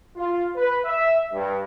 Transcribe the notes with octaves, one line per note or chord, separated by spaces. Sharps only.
F4
B4
E5
G2